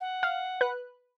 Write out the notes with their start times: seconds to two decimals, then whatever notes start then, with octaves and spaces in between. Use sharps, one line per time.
0.01 F#5
0.23 F5
0.61 B4 F#6